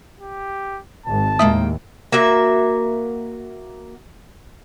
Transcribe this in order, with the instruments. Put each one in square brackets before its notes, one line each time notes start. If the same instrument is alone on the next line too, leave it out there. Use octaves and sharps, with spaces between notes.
[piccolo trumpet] G4
[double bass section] G#1 [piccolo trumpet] A5
[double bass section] D#2 A2 [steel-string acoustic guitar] G#3 A#3 G5 [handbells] E5 D#6
[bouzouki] A#3 F#4 E5